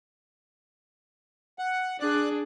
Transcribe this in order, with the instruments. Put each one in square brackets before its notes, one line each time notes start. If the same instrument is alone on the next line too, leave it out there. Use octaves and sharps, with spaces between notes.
[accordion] F#5
[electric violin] D4 G#4 [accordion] D5 F#6